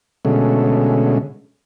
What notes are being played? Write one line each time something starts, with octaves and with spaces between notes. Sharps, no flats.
B2 D3 G#3 A3 C#4